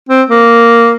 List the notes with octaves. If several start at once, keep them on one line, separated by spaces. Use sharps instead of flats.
C4
A#3